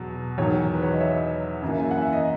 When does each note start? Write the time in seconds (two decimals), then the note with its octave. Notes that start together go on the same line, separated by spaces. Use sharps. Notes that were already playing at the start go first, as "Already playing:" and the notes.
Already playing: E2 B2 F#3
0.38 E2 D#3 F#3 C#5
0.74 B4
0.82 C#5
0.92 D#5
1.00 C#5 E5
1.62 F#2 E3 A#3
1.79 G#5
1.91 F#5
2.01 E5
2.13 D#5